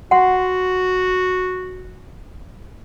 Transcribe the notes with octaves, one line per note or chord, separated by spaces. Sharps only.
F#4 F#5 C6